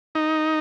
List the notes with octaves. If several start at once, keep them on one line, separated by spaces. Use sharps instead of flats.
D#4